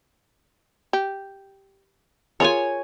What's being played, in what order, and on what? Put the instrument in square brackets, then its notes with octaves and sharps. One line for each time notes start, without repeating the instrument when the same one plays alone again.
[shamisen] G4
[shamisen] F4 G#4 A#4 [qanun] C#5 G#5